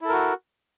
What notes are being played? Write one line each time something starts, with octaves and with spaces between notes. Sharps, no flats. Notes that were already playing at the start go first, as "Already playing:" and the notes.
E4 F#4 A4 A#4